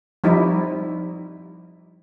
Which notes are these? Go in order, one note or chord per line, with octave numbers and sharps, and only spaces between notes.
F3 G3 D#4 E4